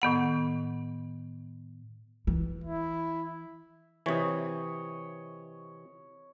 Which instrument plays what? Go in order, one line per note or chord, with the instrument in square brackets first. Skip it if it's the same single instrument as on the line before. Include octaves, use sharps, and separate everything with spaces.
[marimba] A2 D#3 B3 F#5
[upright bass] E3
[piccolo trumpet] E4
[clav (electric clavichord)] C3 E3 [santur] C#5 D#5